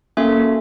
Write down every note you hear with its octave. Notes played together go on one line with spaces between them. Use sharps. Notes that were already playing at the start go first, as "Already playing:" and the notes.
A#3 C#4 F#4 A4 E5